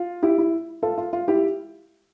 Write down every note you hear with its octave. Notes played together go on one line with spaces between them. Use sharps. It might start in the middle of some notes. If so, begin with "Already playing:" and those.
Already playing: F4
E4 G4
E4
F4 A4
F4
F4
E4 G4